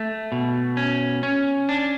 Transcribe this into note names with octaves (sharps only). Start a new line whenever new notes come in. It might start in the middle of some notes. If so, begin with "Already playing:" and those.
Already playing: A3
B2
C#4
C#4
D4